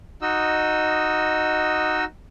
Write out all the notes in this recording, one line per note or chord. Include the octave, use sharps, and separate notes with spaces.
D#4 F#4 D#5 E6